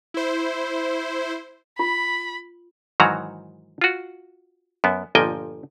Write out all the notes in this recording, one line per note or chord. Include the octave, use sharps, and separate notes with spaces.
E4 C5
F4 B5
G#2 D#3 E3 F#3 F#4 A#5
F4 F#4
F#2 B3
G1 A#2 F3 D#5 G5 G#5